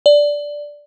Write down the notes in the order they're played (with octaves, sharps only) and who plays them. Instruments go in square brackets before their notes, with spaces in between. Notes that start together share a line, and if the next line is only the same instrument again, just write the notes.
[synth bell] D5